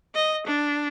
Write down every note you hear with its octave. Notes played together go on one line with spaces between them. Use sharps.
D#5
D4